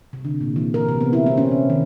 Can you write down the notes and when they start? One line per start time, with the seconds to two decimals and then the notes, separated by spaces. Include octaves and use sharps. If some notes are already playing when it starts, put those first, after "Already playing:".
0.13 C3
0.25 D3
0.41 A#2
0.56 E3
0.74 A#4
0.88 C3
1.01 B3
1.13 E4
1.26 C4
1.38 C#4
1.51 C3
1.70 D#3